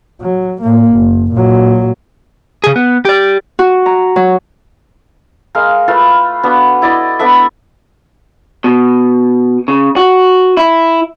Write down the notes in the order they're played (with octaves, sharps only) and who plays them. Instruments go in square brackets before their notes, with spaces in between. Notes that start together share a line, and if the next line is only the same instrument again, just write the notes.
[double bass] F#3
A2 A#3
F#1
A#2 F#3
[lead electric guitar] C#3 G#4
B3
G4 D5
[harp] F#4
A#5
F#3
[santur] G#3 A#4 F5
A3 F4 B4
B3 D4 F#4
E4 D5 D#5
B3 D4 A4 E5
[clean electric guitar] B2
C#3
F#4
E4